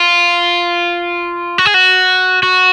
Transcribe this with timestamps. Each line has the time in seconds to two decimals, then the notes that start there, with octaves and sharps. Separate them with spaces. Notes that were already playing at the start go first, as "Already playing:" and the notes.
Already playing: F4
1.58 F#4
1.66 G#4
1.74 F#4
2.43 F#4